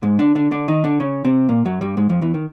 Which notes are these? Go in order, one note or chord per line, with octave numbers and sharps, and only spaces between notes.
G#2 G#3
D3 D4
D3 D4
D3 D4
D#3 D#4
D3 D4
C#3 C#4
C3 C4
A#2 A#3
F#2 F#3
G2 G3
G#2 G#3
F2 F3
E2 E3
D#3